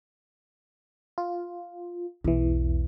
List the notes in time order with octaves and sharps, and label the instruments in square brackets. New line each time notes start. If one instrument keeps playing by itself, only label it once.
[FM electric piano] F4
[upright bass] B1 [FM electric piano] E2 E3